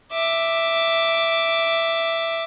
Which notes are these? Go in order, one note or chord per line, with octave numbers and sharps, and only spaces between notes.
E5 D6